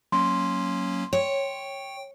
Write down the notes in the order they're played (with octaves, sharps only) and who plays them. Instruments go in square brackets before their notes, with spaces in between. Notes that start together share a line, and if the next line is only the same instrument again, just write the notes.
[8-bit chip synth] F#3 A#3 C#4 [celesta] C6
[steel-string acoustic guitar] C#5 [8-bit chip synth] G5